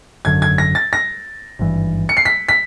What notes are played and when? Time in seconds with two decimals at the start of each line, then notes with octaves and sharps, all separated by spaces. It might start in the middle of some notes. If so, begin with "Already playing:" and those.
0.25 G#1 F#2 D3 G#6
0.42 G#6
0.58 A#6
0.75 A6
0.93 A#6
1.59 G#1 G2 E3
2.09 C#7
2.17 C7
2.25 B6
2.49 B6